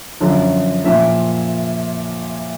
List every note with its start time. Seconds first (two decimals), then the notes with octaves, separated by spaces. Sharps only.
0.20 F#2 D3 F3
0.84 A#2 F3 E5